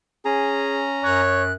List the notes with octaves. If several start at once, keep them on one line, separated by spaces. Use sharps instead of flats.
C#4 G#4 A#5
F#2 C#5 F#6